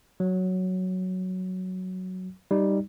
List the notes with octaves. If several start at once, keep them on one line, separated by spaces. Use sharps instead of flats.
F#3
G3 D#4